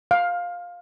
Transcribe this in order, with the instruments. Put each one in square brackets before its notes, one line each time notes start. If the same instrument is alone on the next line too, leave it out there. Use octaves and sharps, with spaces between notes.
[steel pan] F5